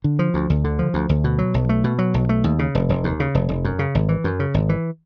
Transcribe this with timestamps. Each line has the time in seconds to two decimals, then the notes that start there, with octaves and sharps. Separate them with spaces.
0.04 D3
0.19 F3
0.34 D2
0.50 D2
0.64 D3
0.79 F3
0.94 D2
1.09 D2
1.24 B2
1.39 F#3
1.54 B1
1.69 A3
1.84 B2
1.99 F#3
2.14 B1
2.29 A3
2.44 D#2
2.59 C#3
2.75 F1
2.89 F1
3.04 D#2
3.20 C#3
3.35 F1
3.49 F1
3.65 F#2
3.79 C#3
3.95 G#1
4.09 E3
4.24 F#2
4.39 C#3
4.54 G#1
4.69 E3